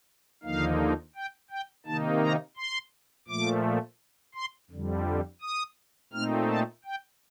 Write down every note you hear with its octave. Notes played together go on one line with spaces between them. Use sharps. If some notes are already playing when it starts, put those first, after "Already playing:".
D#2 D3 F3 A#3 D#4 F5
G5
G5
C3 D#3 A#3 D#4 A5
A#5
C6
A#2 F3 A3 D6
C6
F2 D3 G3
D#6
A#2 A3 C4 D#4 F6
A5
G5